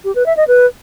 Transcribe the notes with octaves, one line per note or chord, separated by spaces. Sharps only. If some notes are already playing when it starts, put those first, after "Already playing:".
G4
B4
E5
D#5
B4